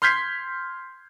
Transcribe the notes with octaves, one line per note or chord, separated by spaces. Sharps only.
C6 F6 G6 G#6 B6 C7